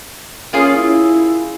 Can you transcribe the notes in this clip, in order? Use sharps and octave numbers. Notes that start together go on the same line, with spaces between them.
A#3 C#4 F4 G#4
E4